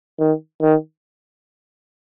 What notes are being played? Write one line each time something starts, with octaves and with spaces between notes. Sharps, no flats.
D#3
D#3